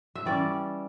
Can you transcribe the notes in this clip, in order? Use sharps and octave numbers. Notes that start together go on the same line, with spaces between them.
E5
E3 G3 C#4 D5